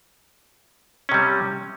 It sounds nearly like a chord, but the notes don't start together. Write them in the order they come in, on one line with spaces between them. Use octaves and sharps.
C#4 C3 G3